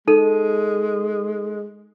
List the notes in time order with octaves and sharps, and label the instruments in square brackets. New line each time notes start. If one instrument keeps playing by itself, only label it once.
[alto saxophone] G#3 [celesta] D#4 A4 D#7